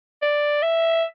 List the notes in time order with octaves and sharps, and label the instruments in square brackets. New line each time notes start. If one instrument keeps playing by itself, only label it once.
[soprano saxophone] D5
E5